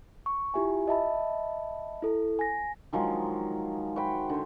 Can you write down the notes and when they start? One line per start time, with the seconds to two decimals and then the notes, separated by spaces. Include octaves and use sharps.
0.26 C#6
0.54 E4 F4 G4 E5 G#5
0.88 D#5 E5 A5 B5
2.02 E4 A4
2.39 G#5 A#6
2.93 D#3 F3 F#3 G#3
3.96 F#4 C5 G5 B5
4.29 D3 C5